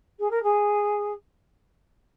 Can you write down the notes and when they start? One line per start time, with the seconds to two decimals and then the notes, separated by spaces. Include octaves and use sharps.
0.19 G#4
0.30 A#4
0.43 G#4